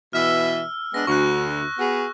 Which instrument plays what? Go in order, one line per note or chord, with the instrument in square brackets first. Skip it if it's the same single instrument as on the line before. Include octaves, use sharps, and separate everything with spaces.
[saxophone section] B2 E3 E5 [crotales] E6 F6
[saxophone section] G#3 B3 D4 [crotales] A#6
[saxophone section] D2 [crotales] C#6 F#6
[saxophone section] B3 F#4 G#4